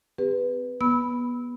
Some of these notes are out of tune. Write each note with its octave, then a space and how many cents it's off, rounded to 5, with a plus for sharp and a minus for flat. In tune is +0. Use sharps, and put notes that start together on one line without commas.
C4 -35 G4 +40 B4 +0
B3 -25 B5 +0 E6 -20